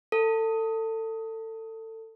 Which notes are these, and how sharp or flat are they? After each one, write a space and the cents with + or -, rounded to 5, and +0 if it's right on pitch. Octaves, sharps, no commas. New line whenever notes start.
A4 +25